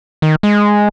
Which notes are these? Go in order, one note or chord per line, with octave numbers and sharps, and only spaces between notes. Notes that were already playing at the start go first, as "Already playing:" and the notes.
D#3
G#3